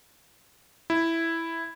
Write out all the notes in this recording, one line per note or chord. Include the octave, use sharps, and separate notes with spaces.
E4